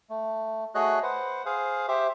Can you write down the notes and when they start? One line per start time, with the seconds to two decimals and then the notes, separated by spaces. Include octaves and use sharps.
0.10 A3
0.75 A3 F#4 G#4 C#5 D#5 F#6
1.03 B4 C5 F#5
1.46 G#4 C5 F5
1.88 G4 C5 E5